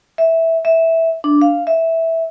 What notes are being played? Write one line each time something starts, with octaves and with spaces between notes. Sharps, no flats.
E5
E5
D4
F5
E5